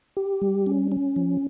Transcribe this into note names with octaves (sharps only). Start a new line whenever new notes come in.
G4
G3
C#4
C#4
F3